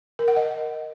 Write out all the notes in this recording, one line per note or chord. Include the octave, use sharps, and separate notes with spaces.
A#4
F#5
D#5